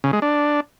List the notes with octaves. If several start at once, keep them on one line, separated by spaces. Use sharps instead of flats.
C#3
G#3
D4